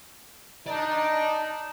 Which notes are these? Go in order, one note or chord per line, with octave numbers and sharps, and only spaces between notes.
D#4 D5 A5